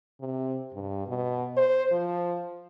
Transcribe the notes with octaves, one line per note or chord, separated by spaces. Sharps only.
C3
G2
B2
C5
F3